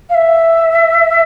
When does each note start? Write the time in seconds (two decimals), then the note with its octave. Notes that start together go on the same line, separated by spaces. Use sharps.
0.09 F5
0.14 E5